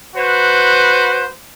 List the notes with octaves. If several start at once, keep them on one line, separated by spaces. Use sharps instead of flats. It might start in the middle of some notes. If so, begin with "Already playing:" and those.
F#4 B4 C5